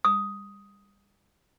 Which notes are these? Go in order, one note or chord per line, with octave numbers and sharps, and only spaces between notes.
D#6